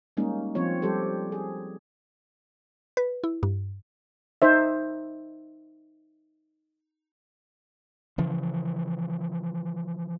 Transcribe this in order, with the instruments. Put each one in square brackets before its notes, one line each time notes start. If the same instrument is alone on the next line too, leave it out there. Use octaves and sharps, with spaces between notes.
[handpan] G3 G#3 A#3 C#4 D#4
F3 C4 F4 C#5
G3 G4 A4 C5
G#4
[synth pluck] B4
E4
G2
[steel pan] D#4 C5 E5
[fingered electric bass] C#3 E3 F3